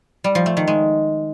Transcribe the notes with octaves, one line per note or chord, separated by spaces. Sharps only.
G3
F3
A3
D#3
G#3